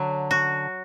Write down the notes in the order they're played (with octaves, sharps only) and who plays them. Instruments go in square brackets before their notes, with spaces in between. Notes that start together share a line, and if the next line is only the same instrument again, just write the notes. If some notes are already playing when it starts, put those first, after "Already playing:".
Already playing: [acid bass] D3 [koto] F#3
[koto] F#4